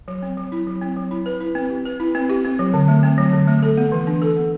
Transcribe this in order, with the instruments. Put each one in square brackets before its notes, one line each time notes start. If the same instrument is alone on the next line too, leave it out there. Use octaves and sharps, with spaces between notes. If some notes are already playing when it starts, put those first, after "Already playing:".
[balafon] F#3
C4
F#3
E4
F#3
C4
F#3
E4
B4
E4
C4
G4
B4
E4
C4
G4
C4
F#3
D3
A3
C4
F#3
D3
A3
A4
B3
E3
D4
A4
B3